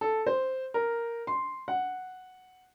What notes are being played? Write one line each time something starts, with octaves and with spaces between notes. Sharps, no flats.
A4
C5
A#4
C6
F#5